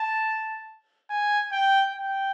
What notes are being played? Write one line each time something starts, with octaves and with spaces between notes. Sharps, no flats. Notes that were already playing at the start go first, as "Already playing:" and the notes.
Already playing: A5
G#5
G5
G5